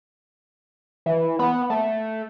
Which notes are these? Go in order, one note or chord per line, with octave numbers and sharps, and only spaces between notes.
E3
B3
A3